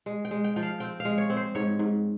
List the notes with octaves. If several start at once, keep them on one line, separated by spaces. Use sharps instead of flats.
G#3
G5
G#3
G5
F3 G5
F5
C4 G5
F5
G#3
C#5
C4
C5
G#2 C#5
G#2